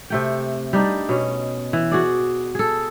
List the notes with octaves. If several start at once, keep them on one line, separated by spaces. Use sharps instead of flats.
C3 A3 G5
G3 D4 D#4
B2 C#4
E3
F#4 G#4 D5
G#4 A4